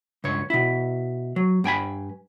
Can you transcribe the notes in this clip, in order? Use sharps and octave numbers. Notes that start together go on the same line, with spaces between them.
C#2 G2 C#5
B2 E4
F#3
G2 G5 G#5 B5